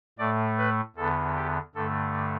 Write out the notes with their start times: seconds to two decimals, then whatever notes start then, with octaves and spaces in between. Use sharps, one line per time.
0.19 A2 A3 D5
0.58 B4
0.96 E2 D3 B3 A4
1.35 G4
1.75 G2 D3 A3 A4